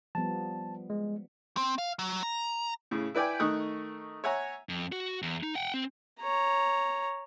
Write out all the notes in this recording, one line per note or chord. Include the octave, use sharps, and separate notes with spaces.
F3 G3 B3 A5
G#3
C4
F5
F#3
A#5
A2 C#3
E4 B4 D5 G5 G#5
D#3 A3 D#4 C#6 D#6 F#6
C#5 E5 F#5 G#5 A#5
F2
F#4
E2
D#4
F#5 G5
C4
C#5 A#5